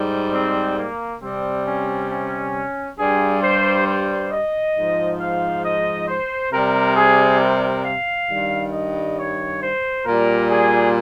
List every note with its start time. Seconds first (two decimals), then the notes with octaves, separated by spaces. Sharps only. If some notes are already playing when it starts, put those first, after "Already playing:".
Already playing: G#2 G3
0.33 C4
0.77 A#3
1.22 C3 G3 C4
1.66 C#4
2.10 C#4
2.98 G2 G3 G#4
3.42 C5
3.87 C5
4.31 D#5
4.75 G#2 F3
5.20 F5
5.64 D#5
6.08 C5
6.52 C3 G3 A#4
6.96 G#4
7.40 A#4
7.84 F5
8.29 G2 D#3 G3
8.73 D#5
9.18 C#5
9.61 C5
10.05 A#2 G3 A#4
10.51 G#4